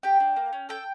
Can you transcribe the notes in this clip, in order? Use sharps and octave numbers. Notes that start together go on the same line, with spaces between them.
G4 G5
D4
A#3
C#4
A4 G5